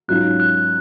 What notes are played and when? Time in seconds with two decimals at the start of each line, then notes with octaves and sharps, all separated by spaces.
0.08 G#2 F#3 C#4 F4 F#6
0.40 F#6